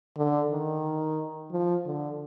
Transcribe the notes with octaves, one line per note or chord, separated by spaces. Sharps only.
D3
D#3
F3
D3